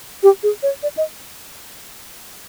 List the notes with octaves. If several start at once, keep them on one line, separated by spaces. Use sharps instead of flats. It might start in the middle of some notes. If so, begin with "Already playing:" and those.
G4
G#4
C#5
D5
D#5